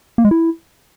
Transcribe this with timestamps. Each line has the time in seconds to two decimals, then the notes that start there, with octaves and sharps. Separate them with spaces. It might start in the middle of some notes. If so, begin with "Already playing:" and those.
0.18 A#3
0.25 G#3
0.31 E4